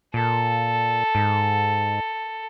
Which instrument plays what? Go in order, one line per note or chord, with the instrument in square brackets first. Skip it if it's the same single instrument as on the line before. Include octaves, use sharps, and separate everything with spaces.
[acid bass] A#2 [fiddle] A4
[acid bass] G#2